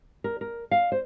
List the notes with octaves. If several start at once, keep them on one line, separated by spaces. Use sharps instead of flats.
A#4
A#4
F5
C5